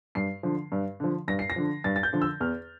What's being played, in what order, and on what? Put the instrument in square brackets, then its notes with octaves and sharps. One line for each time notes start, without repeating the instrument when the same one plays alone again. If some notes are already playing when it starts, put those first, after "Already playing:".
[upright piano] G2 C7
D3 F3
G2
D3 F3
G2 A#6
C7
A#6
D3 F3
G2 A6
A6
G6
D3 F3
E6
E2 F6